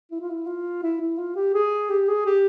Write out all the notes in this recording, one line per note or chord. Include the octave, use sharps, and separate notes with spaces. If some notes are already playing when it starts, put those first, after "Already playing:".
E4
F4
E4
F4
E4
E4
F4
G4
G#4
G4
G#4
G4